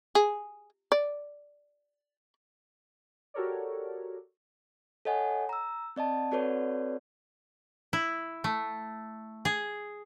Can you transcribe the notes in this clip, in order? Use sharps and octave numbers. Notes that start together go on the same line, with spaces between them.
G#4
D5
F#4 G4 A4 A#4 C#5 D5
A4 C#5 D#5 F#5 G#5
A#5 E6
C4 D5 D#5 A5
C4 F#4 A4 B4 C#5 D5
E4
A3
G#4